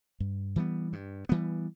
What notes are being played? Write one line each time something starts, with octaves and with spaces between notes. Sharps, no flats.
G2
E3 G3 B3
G2
E3 G3 B3